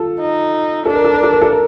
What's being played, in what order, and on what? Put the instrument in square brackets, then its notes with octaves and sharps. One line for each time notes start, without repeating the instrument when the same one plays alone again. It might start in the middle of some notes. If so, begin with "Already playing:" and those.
Already playing: [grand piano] F4 A4
[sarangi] D#4
[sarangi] D4 [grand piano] A4
[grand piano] A#4
A4
A#4
A4
A#4
A4
A#4